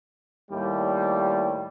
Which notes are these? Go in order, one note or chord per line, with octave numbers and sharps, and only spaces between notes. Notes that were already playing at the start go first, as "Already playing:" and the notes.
D#2 A2 G3